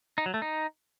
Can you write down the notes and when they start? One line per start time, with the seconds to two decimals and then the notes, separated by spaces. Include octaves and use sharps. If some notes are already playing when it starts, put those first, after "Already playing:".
0.18 D#4
0.26 F#3
0.34 A3
0.42 D#4